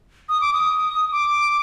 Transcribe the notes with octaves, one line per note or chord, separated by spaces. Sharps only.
D#6
D6
D#6
D6